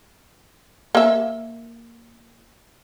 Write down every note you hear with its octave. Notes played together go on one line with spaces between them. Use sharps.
A#3 E5